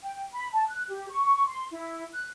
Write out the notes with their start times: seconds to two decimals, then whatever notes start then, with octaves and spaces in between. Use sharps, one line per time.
0.03 G5
0.34 B5
0.53 A5
0.67 F#6
0.89 G4
1.10 C#6
1.46 C6
1.71 E4
2.14 F#6